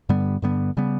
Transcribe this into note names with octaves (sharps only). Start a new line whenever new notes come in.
G2 D3 G3 B3
G2 D3 G3 B3
C#3 G3 B3